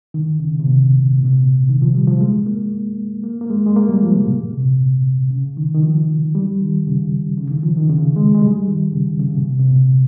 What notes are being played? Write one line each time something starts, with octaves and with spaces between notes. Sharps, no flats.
D#3
C#3
C3
A#2
A#2
C3
A#2
D#3
F3
G3
F3
G#3
A#3
A#3
A#3
G#3
G#3
A#3
G3
F3
C#3
A#2
C3
C#3
D#3
D#3
F3
G3
D#3
C#3
C#3
D#3
F3
D#3
C#3
G#3
G#3
G3
D#3
C#3
C#3
A#2
C3
C3
A#2